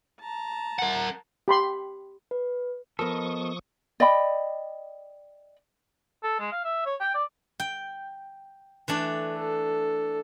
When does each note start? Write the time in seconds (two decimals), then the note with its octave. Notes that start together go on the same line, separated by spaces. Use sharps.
0.20 A5 A#5
0.79 A#4 F#5
1.48 G4 B5 C6
2.31 B4
2.99 F3 B3 A4 A#4 D#5 C#6 D#6
4.00 D5 D#5 G5 B5
6.23 A4
6.40 G#3
6.52 F5
6.64 E5
6.86 C#5
7.00 G5
7.14 D5
7.60 G5
8.88 E3 A3 D4
9.38 A4